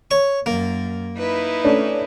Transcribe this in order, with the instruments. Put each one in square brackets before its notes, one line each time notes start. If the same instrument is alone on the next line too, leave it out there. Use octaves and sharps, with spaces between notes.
[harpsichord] C#5 C#6
[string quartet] F#2 [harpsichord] A#3
[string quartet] D#4 E4 B4
[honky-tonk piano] A3 C#4 D4